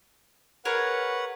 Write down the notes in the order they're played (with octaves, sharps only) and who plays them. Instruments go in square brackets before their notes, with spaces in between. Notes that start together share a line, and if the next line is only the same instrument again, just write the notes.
[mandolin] G#4 A#4 C#5 [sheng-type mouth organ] B4 F#5